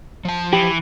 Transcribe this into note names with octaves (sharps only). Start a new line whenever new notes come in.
F3 A5
E3 G4